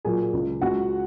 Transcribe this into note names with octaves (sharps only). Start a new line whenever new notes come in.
A#2 F#3 A#3 G#4 G#5
C#2 C#3 G#3
C#2 C#3 G#3 F#4 F#5